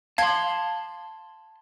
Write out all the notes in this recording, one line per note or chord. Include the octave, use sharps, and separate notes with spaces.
F5 A5 C6 G#6